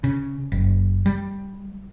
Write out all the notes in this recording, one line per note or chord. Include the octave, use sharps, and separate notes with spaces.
C#3
F#1
G3